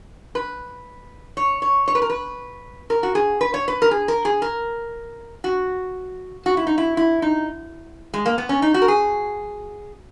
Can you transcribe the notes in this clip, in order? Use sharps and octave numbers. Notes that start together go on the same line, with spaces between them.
B4
C#5
C#5
C#5
B4
A#4
B4
A#4
F#4
G#4
B4
C#5
B4
A#4
G#4
A#4
G#4
A#4
F#4
F#4
E4
D#4
E4
E4
D#4
G#3
A#3
B3
C#4
D#4
F#4
A#4
G#4